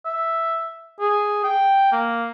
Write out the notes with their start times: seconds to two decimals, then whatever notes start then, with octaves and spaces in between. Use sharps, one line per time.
0.05 E5
1.00 G#4
1.44 G5
1.92 A#3